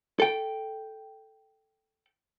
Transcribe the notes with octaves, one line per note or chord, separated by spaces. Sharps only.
A4 G5